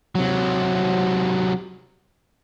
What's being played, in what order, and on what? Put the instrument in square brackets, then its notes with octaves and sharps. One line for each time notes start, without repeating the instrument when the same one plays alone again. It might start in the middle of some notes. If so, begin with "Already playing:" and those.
[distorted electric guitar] C3 F#3